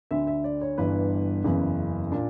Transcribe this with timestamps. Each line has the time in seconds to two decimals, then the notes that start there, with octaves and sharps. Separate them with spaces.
0.11 D2 D3 E5
0.27 E5
0.44 D5
0.61 C#5
0.78 G1 G2 E3 B4
1.44 F#1 E2 C#3 E3
2.12 A#2 D4